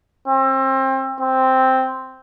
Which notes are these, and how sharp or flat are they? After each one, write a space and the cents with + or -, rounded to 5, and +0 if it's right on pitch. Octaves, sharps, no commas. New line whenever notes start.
C4 +30
C4 +0